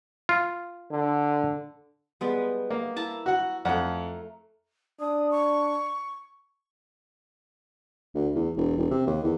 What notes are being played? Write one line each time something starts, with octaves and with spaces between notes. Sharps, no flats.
F4
D3
G3 G#3 B3
A#3
E4 A5 A#5
F#4 F#5
F2 A3 F#5 A#5
D4 D#6
C#6
D2
E2
E1
E1
C3
D#2
E2